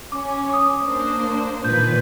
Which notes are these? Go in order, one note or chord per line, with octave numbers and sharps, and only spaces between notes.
C#4 D6
D6 D#6
A#3 D4 C5
A#2 D#3 B4 G6